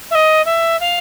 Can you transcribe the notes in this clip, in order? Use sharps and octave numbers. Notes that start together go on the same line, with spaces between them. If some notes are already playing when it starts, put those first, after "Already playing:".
E5
D#5
E5
F5